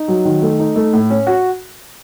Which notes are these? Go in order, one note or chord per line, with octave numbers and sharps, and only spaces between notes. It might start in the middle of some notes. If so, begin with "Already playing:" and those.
Already playing: D#4
F#3
D#3
A3
D#4
A3
A2
C#4
F#4